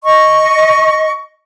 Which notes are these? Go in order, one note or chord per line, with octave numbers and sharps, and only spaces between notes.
D#5 C#6